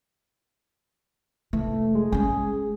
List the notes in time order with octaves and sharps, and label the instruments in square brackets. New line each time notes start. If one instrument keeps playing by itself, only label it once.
[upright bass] F1 E3 [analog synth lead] A3
[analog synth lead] G#3
[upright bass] G#3 C#4 [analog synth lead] G#4